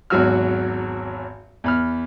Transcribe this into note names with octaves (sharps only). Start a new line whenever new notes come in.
G#1 E2 F#3 F#4 E6 F6
E2 B5 F6